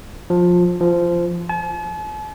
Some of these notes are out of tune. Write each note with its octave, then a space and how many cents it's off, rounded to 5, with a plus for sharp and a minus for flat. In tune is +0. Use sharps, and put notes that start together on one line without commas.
F3 +20
F3 -15
A5 -45